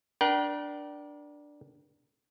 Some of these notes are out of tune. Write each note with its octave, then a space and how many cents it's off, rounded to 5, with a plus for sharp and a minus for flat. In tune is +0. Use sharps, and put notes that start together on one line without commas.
D4 +0 A#4 +45 G5 -40